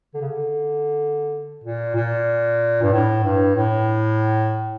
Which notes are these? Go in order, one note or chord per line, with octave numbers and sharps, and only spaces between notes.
D3
C#3
D3
A#2
A#2
G2
A2
G2
A2